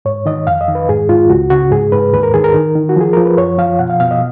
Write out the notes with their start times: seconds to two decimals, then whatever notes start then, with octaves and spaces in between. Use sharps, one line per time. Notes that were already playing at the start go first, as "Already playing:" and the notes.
0.05 G#2 C#5
0.26 D#3 D#5
0.47 F2 F5
0.61 D#5
0.68 D#3
0.75 B4
0.89 G#2 G#4
1.09 G#2 F4
1.30 C#2 F#4
1.50 C#3 F#4
1.71 G#2 G#4
1.92 G#2 B4
2.13 D#2 B4
2.23 A#4
2.34 D#3 G#4
2.44 A#4
2.54 D#3
2.75 D#3
2.89 F#4
2.96 F3 G#4
3.13 F3 A#4
3.25 B4
3.37 F#2 C#5
3.58 F3 F5
3.79 B2 F#5
3.90 F5
4.00 B2 F5
4.11 D#5